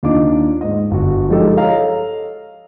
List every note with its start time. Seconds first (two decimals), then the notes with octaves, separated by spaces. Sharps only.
0.03 D#2 D4 D#4 F4 D6
0.61 G#2 D#5
0.91 G1 F#4
1.29 F3 G#3 D#4 G4 A4
1.57 A4 C#5 D#5 F5 A#5